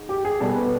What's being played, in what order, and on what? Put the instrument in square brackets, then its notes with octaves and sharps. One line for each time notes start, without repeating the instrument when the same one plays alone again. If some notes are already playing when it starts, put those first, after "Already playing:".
Already playing: [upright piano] G#2
G4
G#4
B2 G3 A4
B4